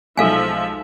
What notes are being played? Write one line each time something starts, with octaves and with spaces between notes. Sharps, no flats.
B1 F3 G#3 D#4 A4 E5 F5 G#5